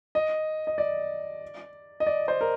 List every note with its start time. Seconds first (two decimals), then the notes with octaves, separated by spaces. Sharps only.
0.15 D#5
0.67 D#5
0.78 D5
2.00 D#5
2.07 D5
2.28 C5
2.41 A#4